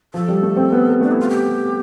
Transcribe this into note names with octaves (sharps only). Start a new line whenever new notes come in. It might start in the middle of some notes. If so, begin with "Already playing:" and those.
F3 A4
G3
A3
C4
B3
A3 D4
E4
F4
G4